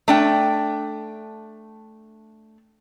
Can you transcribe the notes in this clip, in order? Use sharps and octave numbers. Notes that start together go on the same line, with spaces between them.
A3 D4 G5